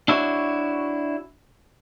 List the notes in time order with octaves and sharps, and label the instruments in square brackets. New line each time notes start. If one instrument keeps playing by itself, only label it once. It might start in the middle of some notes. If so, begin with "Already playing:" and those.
[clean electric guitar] D4 E4 F#4 C#5